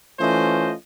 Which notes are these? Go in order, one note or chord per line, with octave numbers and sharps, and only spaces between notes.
E3 A3 C#4 F4 C5 D#5